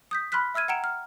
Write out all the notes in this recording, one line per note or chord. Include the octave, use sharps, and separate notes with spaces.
D#6 G6 B6
B5 C6 F6 F#6 B6
E5 E6 F6 G#6 D#7
F#5 G5 A#5 C#7 D7 E7
F6